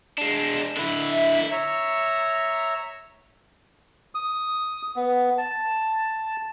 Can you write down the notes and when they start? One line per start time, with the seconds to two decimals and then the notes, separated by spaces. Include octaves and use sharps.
0.18 G#3 D4
0.77 D3 E4
1.11 E5
1.51 C#5 E5 A#5
4.15 D#6
4.96 B3
5.38 A5